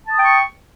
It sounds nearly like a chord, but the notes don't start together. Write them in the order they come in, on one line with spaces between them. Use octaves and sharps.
A5 D#6 G5 C#6